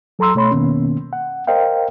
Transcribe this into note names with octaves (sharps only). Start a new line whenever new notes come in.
F#3 A4 A#5 C6 E6
B2 A3 C#5 B5 C6
F2 B2 D#3 A#3 B3 C#4
F#5
A#4 C5 D#5 F5 G5